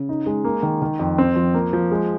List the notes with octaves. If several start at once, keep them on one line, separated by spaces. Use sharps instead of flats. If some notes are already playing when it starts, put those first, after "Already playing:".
Already playing: C#3
D#4
G#3
A#3
D#3
D#3
F2
C4
F3
A#3
F3
G#3